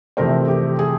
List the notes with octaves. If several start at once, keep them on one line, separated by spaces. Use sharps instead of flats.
F2 C3 E3 A3 A#4 C5
G4
G#4